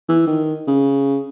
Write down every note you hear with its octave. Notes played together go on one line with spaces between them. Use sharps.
E3
D#3
C#3